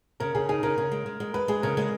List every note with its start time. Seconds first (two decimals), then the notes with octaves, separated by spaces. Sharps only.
0.20 C#3 A#4
0.35 C#3 G#4
0.49 D#4 G#4
0.63 C#3 A#4
0.78 C#3
0.92 G#3
1.06 G#3
1.20 G#3
1.34 G#3 B4
1.48 G#3 G#4
1.62 C#3 A#4
1.77 G#3